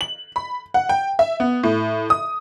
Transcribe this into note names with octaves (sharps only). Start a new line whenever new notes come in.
F#7
B5
F#5
G5
E5
B3
A2
D#6